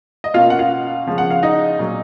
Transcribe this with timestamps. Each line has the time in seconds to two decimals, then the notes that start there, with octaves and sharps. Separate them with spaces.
0.24 D#5
0.34 B2 A#3 C#4 F4 F5
0.50 F#5
0.59 F4 F5
1.07 C#3 F3 G#3 C#4
1.18 F#5
1.30 F5
1.43 D#4 D#5
1.79 A#2 F#3 A#3